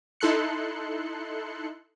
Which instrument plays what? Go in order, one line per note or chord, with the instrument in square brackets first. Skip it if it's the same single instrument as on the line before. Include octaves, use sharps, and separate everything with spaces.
[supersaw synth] D#4 E4 A4 C6 F#6 C#7